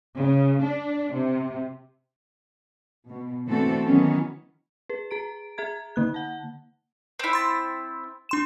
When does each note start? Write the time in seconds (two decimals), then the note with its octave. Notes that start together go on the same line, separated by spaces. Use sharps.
0.17 C#3
0.61 D4
1.13 C3
3.08 B2
3.46 D3 E3 A3 C4 F#4 A4
3.85 D#3 E3 F#3 B3 C#4
4.89 G#4 B4
5.11 G#4 A#5 D7
5.58 G#4 E5 A#5 G#6
5.96 D3 A#3 F#6
6.14 F#5 A5
7.19 C4 E4
7.33 C6 A6
8.29 D4 C6 E7